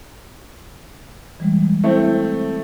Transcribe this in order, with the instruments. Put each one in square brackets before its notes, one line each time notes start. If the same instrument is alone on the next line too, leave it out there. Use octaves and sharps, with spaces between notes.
[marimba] E3 G3 G#3
[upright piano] A3 C4 [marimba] E4